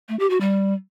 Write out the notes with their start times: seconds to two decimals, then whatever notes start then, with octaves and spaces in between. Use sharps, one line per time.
0.09 A3
0.19 G4
0.30 F#4
0.41 G3